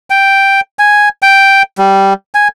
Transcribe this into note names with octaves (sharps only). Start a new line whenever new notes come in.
G5
G#5
G5
G3
G#5